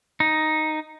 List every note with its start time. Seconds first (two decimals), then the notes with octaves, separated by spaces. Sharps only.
0.20 D#4